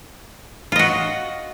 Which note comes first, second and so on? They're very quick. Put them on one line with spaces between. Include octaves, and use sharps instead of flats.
F4 D#5 F#4